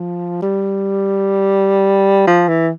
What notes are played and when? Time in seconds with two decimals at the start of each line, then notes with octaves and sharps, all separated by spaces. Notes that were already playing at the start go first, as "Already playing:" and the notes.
Already playing: F3
0.42 G3
2.27 F3
2.48 E3